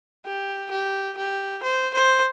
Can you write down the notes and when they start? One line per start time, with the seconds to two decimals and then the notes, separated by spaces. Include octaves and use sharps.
0.26 G4
0.71 G4
1.17 G4
1.63 C5
1.94 C5